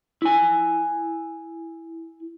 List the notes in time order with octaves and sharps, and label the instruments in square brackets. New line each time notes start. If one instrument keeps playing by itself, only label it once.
[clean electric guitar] E4 G#5